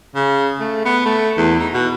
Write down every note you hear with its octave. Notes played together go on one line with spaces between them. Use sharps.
C#3
A3
B3
A3
E2
D#4
B2